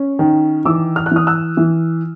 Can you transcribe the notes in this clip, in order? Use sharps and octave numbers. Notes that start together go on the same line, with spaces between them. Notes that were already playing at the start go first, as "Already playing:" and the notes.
Already playing: C#4
D#3
E3 D6 E6
F6
F#6
E3 D#6 F6
E6 F#6
E3